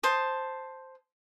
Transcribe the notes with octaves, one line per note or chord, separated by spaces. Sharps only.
C5 A5 D#6